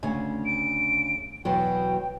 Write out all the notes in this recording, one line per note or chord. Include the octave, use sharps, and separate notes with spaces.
D2 C#3 G#5
D7
E2 B2 F#3 G5